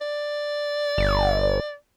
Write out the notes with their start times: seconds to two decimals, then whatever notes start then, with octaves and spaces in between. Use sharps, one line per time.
0.01 D5
0.98 G1